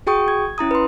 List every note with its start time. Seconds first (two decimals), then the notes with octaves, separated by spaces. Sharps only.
0.07 F#4 G#4 G5 C#6 D#6
0.28 G#6
0.58 C#4 E4 A#5 D#6
0.71 B4 C6